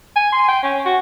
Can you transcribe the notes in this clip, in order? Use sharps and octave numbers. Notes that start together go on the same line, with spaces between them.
G#5
C6
G5
C#4
F#4